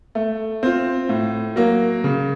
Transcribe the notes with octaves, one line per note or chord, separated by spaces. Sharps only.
A3
C4 F4
A2
F#3 A#3
C#3